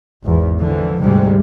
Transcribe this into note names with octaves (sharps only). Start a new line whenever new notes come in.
G#1 E2
D3 E3 F3
D2 G#2 C3 G3 G#3